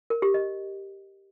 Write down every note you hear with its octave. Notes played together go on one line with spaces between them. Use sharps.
A#4
G4
D#5